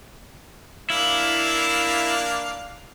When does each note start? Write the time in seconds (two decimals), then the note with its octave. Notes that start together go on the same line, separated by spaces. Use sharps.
0.90 A#3 D4 E4 F5